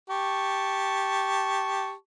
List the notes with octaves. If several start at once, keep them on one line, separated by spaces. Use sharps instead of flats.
G4 A5 C#6